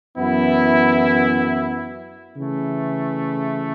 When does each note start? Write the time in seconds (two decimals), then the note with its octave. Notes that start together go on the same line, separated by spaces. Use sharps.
0.17 F#2 E3 B3 E4
2.36 C#3 E3 A3